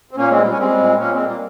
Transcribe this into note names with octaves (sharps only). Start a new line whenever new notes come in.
C4
A#2 A#3 C#4
G#3 C4
G3
C#4
G3 G#3 C4
A#2
A#2 A#3 C#4
G#3 C4
G3
A#3